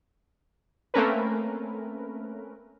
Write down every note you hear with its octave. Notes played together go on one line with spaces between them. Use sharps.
A3 A#3 C4 C#4 A#4 B4